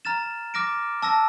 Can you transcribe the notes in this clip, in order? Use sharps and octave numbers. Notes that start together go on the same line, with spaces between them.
A#5 F6 A6 E7
D6 F6 A#6 D7
A5 E6 A#6